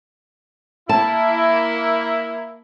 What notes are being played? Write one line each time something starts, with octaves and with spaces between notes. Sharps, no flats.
A#3 E4 A5